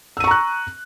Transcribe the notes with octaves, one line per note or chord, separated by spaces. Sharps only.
A#5 C#6 E6 F#6 D#7